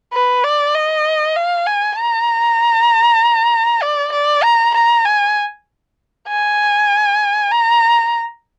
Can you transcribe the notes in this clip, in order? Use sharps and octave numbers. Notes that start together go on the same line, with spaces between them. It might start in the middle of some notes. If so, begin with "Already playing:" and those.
B4
D5
D#5
F5
G#5
A#5
D5
D5
A#5
A#5
G#5
G#5
A#5